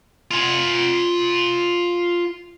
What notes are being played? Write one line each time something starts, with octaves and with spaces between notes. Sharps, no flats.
F4 G#5